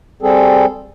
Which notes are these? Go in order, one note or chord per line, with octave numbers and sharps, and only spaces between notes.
G3 C4 G#4 A4